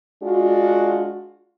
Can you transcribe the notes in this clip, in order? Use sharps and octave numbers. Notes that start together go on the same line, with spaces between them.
G#3 D4 F4 F#4